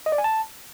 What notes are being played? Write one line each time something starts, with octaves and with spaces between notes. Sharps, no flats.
D#5
D5
G#5
A5